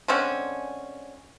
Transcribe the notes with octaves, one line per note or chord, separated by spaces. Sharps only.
D3 G#3 C4 C#4